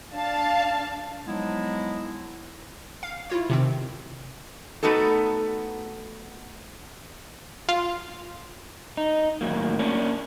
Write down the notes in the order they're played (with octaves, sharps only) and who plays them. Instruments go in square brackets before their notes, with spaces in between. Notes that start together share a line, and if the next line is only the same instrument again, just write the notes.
[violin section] D4 F5 A5
[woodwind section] F3 F#3 G#3 B3 D#4 E4
[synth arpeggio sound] F5
E4 F4 C#5
C3 D#3 C4
[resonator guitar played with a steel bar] A3 B3 D#4 F#4 A4
[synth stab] F4
[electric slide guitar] D#4
A2 D#3 F#3 A#3
A#3 C#4 D4